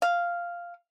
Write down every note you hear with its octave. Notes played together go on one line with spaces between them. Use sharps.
F5